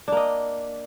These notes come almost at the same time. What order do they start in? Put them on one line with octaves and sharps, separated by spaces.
D4 A#3 D#5